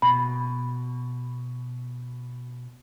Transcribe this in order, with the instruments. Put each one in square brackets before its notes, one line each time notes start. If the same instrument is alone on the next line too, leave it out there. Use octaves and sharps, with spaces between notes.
[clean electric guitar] B2 [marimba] B5